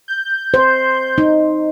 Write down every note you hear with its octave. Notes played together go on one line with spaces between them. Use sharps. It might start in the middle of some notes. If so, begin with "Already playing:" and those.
G6
C5
D#4